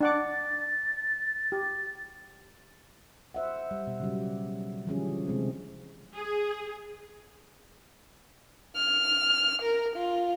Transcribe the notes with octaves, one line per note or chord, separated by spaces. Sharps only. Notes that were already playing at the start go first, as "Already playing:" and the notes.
D4 F#5 D6 A6
G4
C5 E5 F#5
G3
B2
C#3 F#3 G3
D3 E3 F3 G3 C#4 G#4
C3 G#3 C4
G#4
F6
A#4
F4